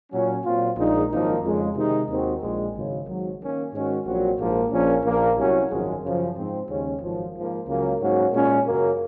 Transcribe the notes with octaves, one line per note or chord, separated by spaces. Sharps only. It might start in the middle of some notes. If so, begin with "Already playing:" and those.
A#2 F#3 C#4
A#2 F#3 C4 F4
A#1 A#2 G#3 D#4
G#1 F#2 F3 A#3 D#4
F2 C#3 G#3
C3 D#3 G#3 D#4
D#2 D#3 G#3 C4 F#4
A#1 A#2 G#3
G#1 F#2 C#3
G#1 G#2 F#3
D#3 A#3 C#4
G#2 D#3 G#3 C#4 F#4
A#1 A#2 F#3 C4 F#4
A#1 G#2 F3 A#3
A#1 A#2 F3 A#3 C#4
A#1 A#2 F3 A#3
C2 C3 F#3 C#4 F#4
G#1 F#2 F3 G#3
F#2 C#3 F3
G#2 F3 C4
D#2 C#3 G#3 C#4
G#1 F#2 F3
G#2 F3 A#3
C#2 C#3 F#3 A#3
G#2 F#3 A#3 C#4 F#4
A#2 G#3 C#4
F#2 C#3 F#3 A#3